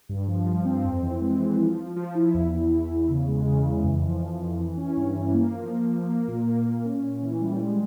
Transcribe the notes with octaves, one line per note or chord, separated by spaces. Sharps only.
G2
F3
F3
C4
F2
E3
G#3
E3
F3
F3
F3
E4
E2
E2
E2
E2
C#3
G#3
C#3
E3
F2
F3
F2
F2
E3
C#4
G2
E3
A#3
F3
A#3
F3
A#3
A#2
A#3
A#2
C#4
C#4
E3
G3
G#3